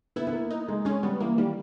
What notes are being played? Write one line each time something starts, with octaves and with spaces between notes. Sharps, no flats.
B3 E4
B3
A#3
D#4
G#3
G#3 C#4
G3 B3
E3 A#3
D#3 G3